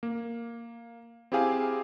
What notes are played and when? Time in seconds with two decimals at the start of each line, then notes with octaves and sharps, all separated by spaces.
0.03 A#3
1.32 C4 E4 G4 G#4 F5 G#5